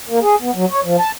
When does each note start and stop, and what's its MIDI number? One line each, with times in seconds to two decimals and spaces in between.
0.09 0.19 58
0.22 0.35 68
0.42 0.51 59
0.55 0.65 54
0.71 0.80 73
0.85 0.96 53
0.99 1.12 81